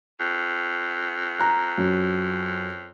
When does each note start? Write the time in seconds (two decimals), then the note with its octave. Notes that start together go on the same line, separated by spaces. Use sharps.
0.20 F2
1.39 A#5 F#6
1.78 F#2